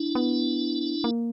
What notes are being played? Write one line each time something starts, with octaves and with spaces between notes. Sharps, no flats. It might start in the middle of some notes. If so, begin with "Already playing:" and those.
Already playing: D4 E4
B3
A#3